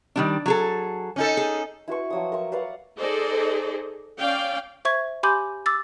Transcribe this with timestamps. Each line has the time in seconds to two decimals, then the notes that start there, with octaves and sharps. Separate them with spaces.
0.16 D#3 G3 D4
0.46 F#3 G#4 A4
1.16 C#4 D#4 A4
1.37 G#4
1.88 E4 F#4 B4 C#6
2.10 F3 F#3 D#6
2.32 A#4 E5 C#6
2.52 B4 D5 F5 F#5
2.98 D#4 G#4 A4 C5 D5 D#5
4.18 C#4 D5 F5 G5
4.85 C5 E5 C#6 G#6
5.23 G4 G#5 B5 C6 D6 G6
5.66 D6 E6 A6